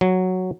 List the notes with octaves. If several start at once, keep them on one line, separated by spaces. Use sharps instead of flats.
F#3